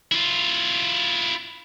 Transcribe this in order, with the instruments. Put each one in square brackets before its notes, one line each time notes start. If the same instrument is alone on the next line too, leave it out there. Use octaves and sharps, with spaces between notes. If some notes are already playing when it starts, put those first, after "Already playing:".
[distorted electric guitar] E4 F4